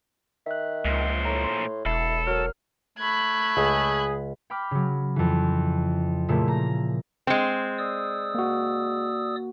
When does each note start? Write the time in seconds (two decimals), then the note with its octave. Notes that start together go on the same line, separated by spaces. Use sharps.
0.46 D#3 E5 F#6
0.85 C#2 A#2 C5
1.25 A2 A#5
1.44 C6
1.86 E1 E4 A4 B5 C7
2.27 F#3 A#4 F6
2.98 A3 B5 F#6 G#6
3.57 C#2 G#4
4.50 G5 B5 D6 F6
4.71 C#3 F#3
5.16 F2 E3
6.29 A#2 C#3 F3 A3 A#3 E4
6.48 A#5
7.27 G#3 C4
7.78 D5 D#6 E6
8.35 A#3 F#4